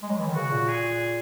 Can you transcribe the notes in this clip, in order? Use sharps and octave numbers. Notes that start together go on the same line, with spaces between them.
G#3
F#3
E3
D#3
C#3 F#4
A#2
G#4